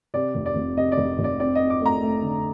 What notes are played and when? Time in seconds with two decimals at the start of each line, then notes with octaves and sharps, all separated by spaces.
0.14 C3 D5
0.35 F1
0.46 D5
0.56 F1
0.77 C3 D#5
0.92 D5
0.98 F1
1.19 F1
1.24 D5
1.40 C4 D5
1.55 C4 D#5
1.70 D6
1.81 A3 A#5
2.01 A3
2.22 D3